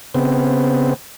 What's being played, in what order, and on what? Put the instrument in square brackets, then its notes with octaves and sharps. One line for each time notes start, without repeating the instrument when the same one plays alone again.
[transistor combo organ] C#3 B3 C4